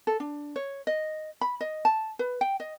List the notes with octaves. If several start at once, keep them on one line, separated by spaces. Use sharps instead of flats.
A4
D4
C#5
D#5
B5
D#5
A5
B4
G5
D#5